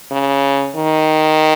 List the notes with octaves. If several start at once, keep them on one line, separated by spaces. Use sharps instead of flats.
C#3
D#3